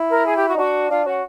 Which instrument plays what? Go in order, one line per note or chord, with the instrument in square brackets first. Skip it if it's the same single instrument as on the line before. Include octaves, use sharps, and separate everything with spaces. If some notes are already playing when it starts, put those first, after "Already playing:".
Already playing: [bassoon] E4
[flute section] A#4
G#4
G4
F#4
[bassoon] D#4
[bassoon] D4 [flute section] F#4
[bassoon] D4 [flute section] F4
[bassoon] C#4 [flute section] F#4